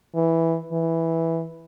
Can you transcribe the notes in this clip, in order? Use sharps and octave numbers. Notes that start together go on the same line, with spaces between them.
E3
E3